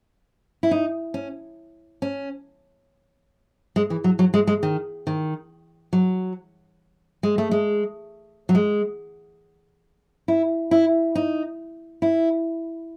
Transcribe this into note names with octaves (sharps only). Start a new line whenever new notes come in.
E4
D#4
C#4
C#4
G#3
E3
F#3
F#3
G#3
G#3
D#3
D#3
F#3
G#3
A3
G#3
F#3
G#3
E4
E4
D#4
E4